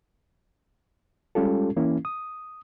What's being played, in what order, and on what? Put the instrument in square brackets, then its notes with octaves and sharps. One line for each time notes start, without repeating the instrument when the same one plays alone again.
[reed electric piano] G3 G#3 C#4 F4 G4 A4
E3 A#3 C#4 E4
D#6